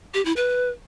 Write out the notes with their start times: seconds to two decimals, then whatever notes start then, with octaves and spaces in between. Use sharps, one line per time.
0.14 G4
0.25 E4
0.36 B4